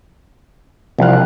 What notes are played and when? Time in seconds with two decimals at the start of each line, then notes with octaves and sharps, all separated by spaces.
0.99 C2 C3 F3 F5 F#6